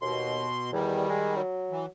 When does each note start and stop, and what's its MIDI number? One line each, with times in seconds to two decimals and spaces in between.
0.02 0.45 39
0.02 0.71 47
0.02 0.71 84
0.73 1.05 40
0.73 1.42 51
0.73 1.42 55
1.09 1.36 56
1.36 1.86 54
1.71 1.86 52